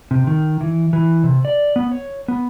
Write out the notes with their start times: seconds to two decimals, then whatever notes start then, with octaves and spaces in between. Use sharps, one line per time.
0.11 C3
0.27 D#3
0.61 E3
0.93 E3
1.24 C3
1.45 D5
1.76 B3
1.91 C#5
2.28 B3